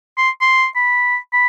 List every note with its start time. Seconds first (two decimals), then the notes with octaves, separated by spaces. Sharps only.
0.18 C6
0.41 C6
0.76 B5
1.33 B5